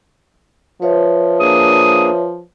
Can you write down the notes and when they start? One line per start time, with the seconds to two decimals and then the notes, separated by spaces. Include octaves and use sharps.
0.82 F3 B4 C#5 E5
1.40 A#3 D4 G#4 D#6